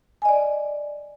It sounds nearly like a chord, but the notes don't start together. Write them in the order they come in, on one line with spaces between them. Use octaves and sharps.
G#5 D#5 D5